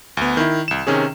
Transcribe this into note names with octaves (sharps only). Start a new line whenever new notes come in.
D2 B3
D#3 E4
C2 E7
C3 D#3 C#4 G#4